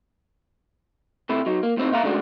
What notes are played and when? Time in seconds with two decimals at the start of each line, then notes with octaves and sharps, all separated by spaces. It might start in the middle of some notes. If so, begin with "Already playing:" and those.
1.29 C3 A3 E4
1.46 F#3 D#4
1.63 A#3
1.77 A2 C4 D#4
1.91 A#2 E5 F5 A#5
2.03 G#2 C#3 A3 D4 F#4